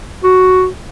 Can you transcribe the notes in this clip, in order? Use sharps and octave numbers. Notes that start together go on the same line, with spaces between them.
F#4